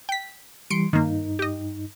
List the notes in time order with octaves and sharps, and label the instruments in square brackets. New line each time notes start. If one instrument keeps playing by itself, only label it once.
[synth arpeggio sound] G5 B6
[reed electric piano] E3 G3 [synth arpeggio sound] C6 C#7 D7
[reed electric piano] G2 D#4 [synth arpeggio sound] D#3 A#3
[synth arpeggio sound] G4 D#5